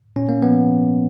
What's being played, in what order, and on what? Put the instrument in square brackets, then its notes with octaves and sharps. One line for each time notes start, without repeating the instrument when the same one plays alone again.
[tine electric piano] A#2 C#4
A#3
F3 B3